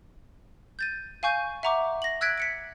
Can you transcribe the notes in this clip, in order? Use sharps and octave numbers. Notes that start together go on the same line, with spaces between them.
G6 A6 D#7
F5 G#5 C#6 G6 D#7
E5 F#5 A#5 C#6 D6
A#6 F#7
E6 F#6 G#6 B6 D7
B6 C#7 D7